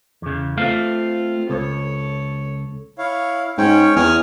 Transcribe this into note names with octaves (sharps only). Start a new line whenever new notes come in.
E2 C#3
A3 C4 F4 F5
C#2 A4 C#5
E4 C#5 F5
G#2 C#4 C#5 G5
E2 G#5 D#6 F6